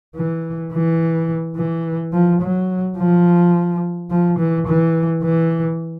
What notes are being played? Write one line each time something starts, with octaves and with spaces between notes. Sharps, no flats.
E3
E3
E3
F3
F#3
F3
F3
E3
E3
E3